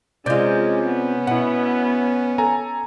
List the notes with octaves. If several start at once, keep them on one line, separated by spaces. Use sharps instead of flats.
C3 G#3 C#4 F4 D5 G6
B3
B2 E4 F#5
A4 G#5 A#5